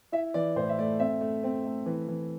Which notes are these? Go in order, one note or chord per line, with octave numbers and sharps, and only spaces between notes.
E4 E5
E3 D5
A2 C5
E5
A3 D5
C4 E5
A3
C4
A3
E3
E3